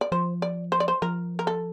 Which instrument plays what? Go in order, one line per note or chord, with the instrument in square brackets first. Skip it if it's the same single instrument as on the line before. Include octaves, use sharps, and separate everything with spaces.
[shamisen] D5
[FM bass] F3 [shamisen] C5
[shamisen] D5
C5
D5
C5
[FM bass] F3 [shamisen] A#4
[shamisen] A#4
A4